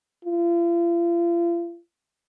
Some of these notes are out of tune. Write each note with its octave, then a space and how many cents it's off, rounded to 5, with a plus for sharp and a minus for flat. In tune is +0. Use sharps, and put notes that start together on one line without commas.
F4 -40